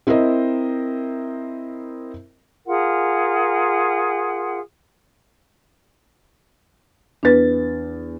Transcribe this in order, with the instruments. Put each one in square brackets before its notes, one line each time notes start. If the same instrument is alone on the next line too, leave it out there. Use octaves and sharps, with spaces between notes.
[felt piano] C4 E4 A#4 C5 D#5
[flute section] F4 G#4 A#4 F#5
[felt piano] E2 A6 [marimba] D4 B4